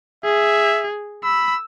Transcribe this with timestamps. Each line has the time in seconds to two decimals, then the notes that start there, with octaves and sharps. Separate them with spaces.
0.25 G#4 E5
1.24 B5 E6